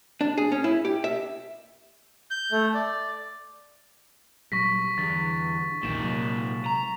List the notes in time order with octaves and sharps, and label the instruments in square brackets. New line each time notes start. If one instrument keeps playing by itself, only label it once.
[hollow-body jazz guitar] D4
G#4
C#4
E4
G4
E5
[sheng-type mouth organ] G6
A3
D5
[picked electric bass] A#2 F#3 G3 [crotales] C#6 A#6 B6
[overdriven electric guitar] E2 [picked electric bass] G2 D3 [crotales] A6
[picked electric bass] A#1 E2 [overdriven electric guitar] A#2 D#3 [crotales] E7
[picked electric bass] C3 F#3 G#3
[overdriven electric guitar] A#5